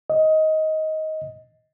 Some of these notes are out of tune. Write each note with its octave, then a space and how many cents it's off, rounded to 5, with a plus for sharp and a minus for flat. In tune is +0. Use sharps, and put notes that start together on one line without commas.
D#5 +15